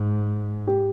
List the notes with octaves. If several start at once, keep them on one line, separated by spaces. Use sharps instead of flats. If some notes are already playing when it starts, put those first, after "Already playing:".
Already playing: G#2
G4